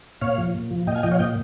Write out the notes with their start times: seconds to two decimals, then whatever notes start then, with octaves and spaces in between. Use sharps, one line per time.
0.21 A#2 C#5 F5
0.38 F3
0.54 A#2
0.71 F3
0.87 A#2 D#5 G5
0.95 F5 G#5
1.03 F3 D#5 G5
1.11 C#5 F5
1.19 A#2 D#5 G5